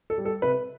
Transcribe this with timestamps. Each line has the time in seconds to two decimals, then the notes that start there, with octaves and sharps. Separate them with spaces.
0.10 A4
0.18 G3
0.25 A4
0.42 C3 B4